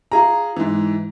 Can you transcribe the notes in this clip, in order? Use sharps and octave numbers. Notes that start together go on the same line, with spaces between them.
F4 G#4 A#5
G#2 E3